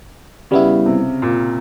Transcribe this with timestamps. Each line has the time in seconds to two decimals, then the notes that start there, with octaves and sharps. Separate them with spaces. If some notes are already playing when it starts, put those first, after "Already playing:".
0.51 C#3 G3 B3 E4
0.86 C3
1.22 A#2